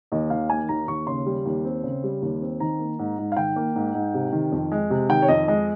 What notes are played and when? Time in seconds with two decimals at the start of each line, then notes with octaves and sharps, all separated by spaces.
0.12 D#2 D#5
0.30 D#3 F5
0.49 A#3 G#5
0.69 D#2 A#5
0.88 D#2 C#6
1.07 C#3 C6
1.26 G3
1.46 D#2
1.65 C4
1.83 C#3
2.04 G3
2.22 D#2
2.42 C4
2.60 D#3 A#5
2.79 A#3
2.99 G#2
3.19 G#2
3.32 F5
3.37 D#3 G5
3.56 A#3
3.76 G#2
3.95 G#2
4.14 C3
4.32 D#3
4.52 F2
4.72 G#3
4.90 C3
5.09 D#3 G5
5.22 C#5
5.28 F2 D#5
5.48 G#3 D#5